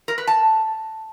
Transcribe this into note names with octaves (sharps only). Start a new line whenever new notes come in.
A#4
B4
A5